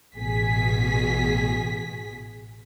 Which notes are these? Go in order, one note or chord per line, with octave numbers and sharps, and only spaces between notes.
A1 B2 G#4 B6